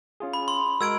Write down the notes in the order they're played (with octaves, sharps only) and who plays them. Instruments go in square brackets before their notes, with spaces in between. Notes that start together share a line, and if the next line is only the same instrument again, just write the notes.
[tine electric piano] C#4 F4 G#4
[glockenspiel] B5
C6
[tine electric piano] G#3 F#4 A#4 [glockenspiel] E6 G#6 D7